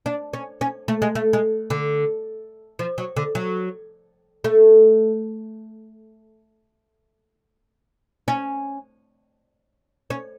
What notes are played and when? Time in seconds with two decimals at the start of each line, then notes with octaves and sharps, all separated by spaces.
0.06 D4
0.33 C#4
0.61 C#4
0.88 A3
1.02 G#3
1.15 A3
1.33 G#3
1.70 D3
2.79 F3
2.98 F#3
3.16 D3
3.35 F#3
4.44 A3
8.28 C#4
10.10 C#4